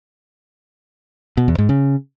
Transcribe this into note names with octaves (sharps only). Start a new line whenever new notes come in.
B2
E2
G#2
C#3